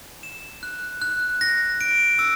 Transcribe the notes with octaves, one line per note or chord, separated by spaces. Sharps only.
E7
F#6
F#6
A#6
D7
E6